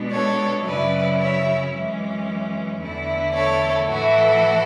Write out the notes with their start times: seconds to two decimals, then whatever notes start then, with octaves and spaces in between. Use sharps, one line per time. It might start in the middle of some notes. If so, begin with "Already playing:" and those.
Already playing: B2 G#3 B3 D4
0.11 A4 C#5
0.65 F#2 C#3 F#3 C#4 E4 B4 D5
1.18 C#5 E5
1.73 F#2 E3 G#3 C#4
2.81 E2 D3 A3 E4
3.34 A4 C#5
3.88 A2 E3 A3 E4 F#4 A4